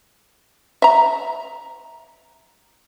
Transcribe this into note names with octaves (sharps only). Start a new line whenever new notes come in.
E5 A#5